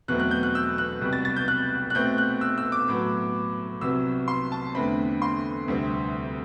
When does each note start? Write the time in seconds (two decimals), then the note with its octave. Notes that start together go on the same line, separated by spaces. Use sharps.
0.08 E2 B2 F#3 A3 C4 F#6
0.20 F#6
0.31 G6
0.43 F#6
0.55 E6
0.78 F#6
1.01 C2 B2 G3
1.13 A6
1.25 A6
1.36 G6
1.48 F#6
1.90 F#6
1.95 B2 A3 C4 G6
2.18 F#6
2.41 E6
2.58 E6
2.72 D6
2.88 A2 F#3 B3
3.81 C2 C3 F#3 B3 E6
4.28 C6
4.52 A5
4.75 E2 D3 A3 C4 B5
5.22 C6
5.68 D2 C3 G3 C4